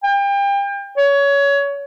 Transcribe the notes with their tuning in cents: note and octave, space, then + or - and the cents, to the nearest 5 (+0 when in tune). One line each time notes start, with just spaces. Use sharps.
G5 +30
C#5 +20